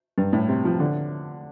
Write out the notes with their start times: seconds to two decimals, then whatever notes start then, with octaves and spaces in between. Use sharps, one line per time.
0.18 G2
0.33 A2
0.48 C3
0.65 F3
0.80 D3